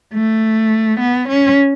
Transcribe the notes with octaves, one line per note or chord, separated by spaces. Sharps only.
A3
B3
C#4